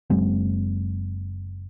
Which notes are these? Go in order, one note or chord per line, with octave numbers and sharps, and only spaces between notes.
F#1 F#3 G#3 C4